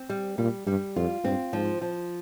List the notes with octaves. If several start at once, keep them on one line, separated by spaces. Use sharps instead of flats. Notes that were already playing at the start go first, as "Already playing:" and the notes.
Already playing: C4
G3
A#2 G3
G2 G3
F2 F4
G2 C4
G#2 F3
F3